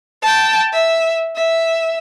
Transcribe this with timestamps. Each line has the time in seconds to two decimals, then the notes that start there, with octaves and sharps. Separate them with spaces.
0.22 G5 A5
0.73 E5
1.36 E5